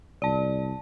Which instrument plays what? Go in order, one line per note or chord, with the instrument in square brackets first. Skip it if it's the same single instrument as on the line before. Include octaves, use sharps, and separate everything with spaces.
[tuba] C2 [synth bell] D5 A5